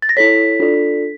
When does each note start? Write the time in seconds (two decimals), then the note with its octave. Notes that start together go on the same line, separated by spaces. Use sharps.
0.02 A6
0.09 A#6
0.17 E4 A4 C#5 B6
0.60 D4 F4 A4 D5